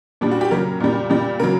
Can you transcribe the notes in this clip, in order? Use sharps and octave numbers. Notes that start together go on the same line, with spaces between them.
A#2 G3 D4
F#4
G4
C#3 F#3 A#4
A#2 G3
A#2 G3
C#3 F#3 A#4